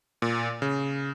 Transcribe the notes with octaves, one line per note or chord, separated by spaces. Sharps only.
A#2
C#3